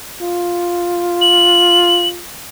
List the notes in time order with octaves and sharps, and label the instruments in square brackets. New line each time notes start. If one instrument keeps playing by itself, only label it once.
[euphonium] F4
[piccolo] F#7